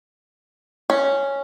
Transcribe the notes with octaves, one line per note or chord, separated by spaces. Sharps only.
C#4